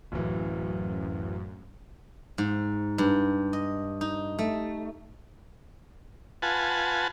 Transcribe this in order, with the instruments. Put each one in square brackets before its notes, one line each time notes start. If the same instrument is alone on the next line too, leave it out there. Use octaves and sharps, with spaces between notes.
[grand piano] D1 E3 [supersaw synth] F#2
[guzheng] G#2
G2
D#5
D#4
A3
[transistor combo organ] F4 B4 F#5 G#5 A5